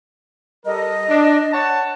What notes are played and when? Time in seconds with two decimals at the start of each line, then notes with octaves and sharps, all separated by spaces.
0.65 G3 A4 A#4 D#5
1.09 D4
1.52 C#5 F#5 A5